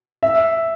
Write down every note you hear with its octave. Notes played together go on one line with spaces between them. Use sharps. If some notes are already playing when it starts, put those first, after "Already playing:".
E5